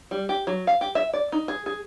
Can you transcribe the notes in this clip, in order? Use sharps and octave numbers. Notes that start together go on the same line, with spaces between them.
G3
G4
F#3
F5
G4
E5
D5
D#4
G#4
G#4